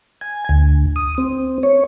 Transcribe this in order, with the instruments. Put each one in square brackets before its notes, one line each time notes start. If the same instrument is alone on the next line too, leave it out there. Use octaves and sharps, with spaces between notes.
[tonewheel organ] G#5
D2
D#6
C4
C#5